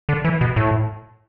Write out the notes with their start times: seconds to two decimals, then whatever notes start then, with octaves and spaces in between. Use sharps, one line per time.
0.09 D3
0.24 E3
0.41 B2
0.56 A2